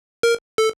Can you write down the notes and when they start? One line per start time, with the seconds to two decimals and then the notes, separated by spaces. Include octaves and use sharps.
0.23 A#4
0.58 A4